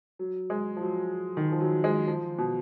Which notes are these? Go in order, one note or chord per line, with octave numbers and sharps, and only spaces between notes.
F#3
G#3
F3
F#3
D#3
F3
F#3
G#3
F3
B2